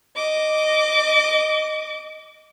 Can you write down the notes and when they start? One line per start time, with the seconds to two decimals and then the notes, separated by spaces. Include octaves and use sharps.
0.16 D#5 D6